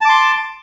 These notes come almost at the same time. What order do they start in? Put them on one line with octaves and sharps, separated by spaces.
A5 D6 C6